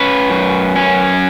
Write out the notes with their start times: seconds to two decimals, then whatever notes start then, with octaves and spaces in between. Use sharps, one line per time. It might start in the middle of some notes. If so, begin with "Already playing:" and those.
Already playing: C#4 B4
0.30 F#2
0.76 C#4